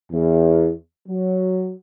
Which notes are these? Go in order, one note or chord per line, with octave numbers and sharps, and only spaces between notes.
E2
F#3